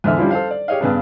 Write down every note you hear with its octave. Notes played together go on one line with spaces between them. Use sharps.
E2 G#2 D3 E5 F6
F3 G3 C#4 D4 E4 F4
A4 C5 F5
D5
G4 G#4 C#5 D#5 F5
G2 C#3 B3 D4